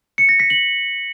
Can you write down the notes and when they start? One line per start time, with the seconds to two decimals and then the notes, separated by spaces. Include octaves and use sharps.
0.18 C#7
0.29 A#6
0.40 B6
0.50 F#7